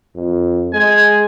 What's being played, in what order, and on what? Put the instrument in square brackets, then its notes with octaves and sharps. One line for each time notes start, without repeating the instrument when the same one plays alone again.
[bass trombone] F2
[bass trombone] G#3 [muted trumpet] G#5